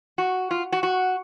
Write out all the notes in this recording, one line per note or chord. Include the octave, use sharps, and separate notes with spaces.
F#4
F4
F#4
F#4